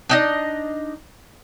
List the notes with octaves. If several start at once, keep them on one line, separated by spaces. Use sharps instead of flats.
D4 D#4 D#5